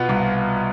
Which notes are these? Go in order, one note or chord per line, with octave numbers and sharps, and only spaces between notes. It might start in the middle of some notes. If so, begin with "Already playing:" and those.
Already playing: B2 B3 F4
C2